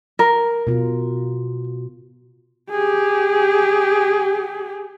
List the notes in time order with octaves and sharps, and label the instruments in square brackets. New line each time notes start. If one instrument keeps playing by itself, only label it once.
[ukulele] A#4
[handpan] B2 F4
[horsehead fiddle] G4 G#4